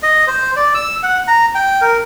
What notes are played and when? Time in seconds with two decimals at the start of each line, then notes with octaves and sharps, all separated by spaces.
0.03 D#5
0.27 C5
0.56 D5
0.74 E6
1.03 F#5
1.28 A#5
1.55 G5
1.81 A#4